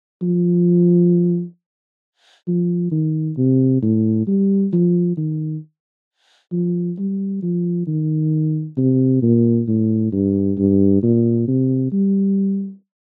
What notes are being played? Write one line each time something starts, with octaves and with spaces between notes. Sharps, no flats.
F3
F3
D#3
C3
A2
G3
F3
D#3
F3
G3
F3
D#3
C3
A#2
A2
G2
G2
A#2
C3
G3